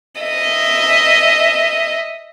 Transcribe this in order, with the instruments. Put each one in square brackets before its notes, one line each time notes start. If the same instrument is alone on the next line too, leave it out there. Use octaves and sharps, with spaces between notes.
[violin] D#5 E5